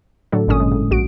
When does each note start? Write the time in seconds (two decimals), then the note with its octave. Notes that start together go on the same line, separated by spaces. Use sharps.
0.32 A2 D3 F#3 D4 A4
0.47 G#1 G2 A#2 D3 C#4 D#6
0.60 G#3
0.72 A2
0.91 A#1 F#4 D7